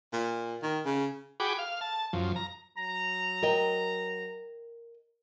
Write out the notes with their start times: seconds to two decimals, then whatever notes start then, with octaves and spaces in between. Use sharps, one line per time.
0.13 A#2
0.63 D#3
0.85 C#3
1.40 F#4 G#4 G5 B5 D6
1.58 F5
1.81 A5
2.13 F#2 F3
2.36 A#5
2.77 F#3 A#5
3.43 A#4 D#5 G5